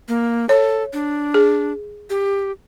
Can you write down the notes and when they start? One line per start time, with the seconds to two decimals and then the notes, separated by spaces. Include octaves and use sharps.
0.09 A#3
0.49 A4 C#5
0.93 D4
1.34 G#4
2.10 G4